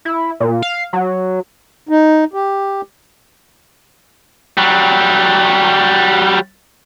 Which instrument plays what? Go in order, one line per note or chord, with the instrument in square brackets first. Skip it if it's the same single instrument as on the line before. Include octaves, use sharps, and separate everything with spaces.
[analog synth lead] E4
A#2
F5
F#3
[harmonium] D#4
G4
[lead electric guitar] F#3 G3